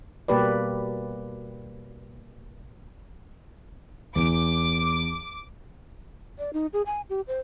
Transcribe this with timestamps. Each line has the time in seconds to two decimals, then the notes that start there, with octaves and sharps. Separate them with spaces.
0.28 B2 G3 A#3 G4 B4 D5
4.16 E2 D6
6.38 D5
6.53 D#4
6.73 G#4
6.86 G#5
7.09 G4
7.27 C5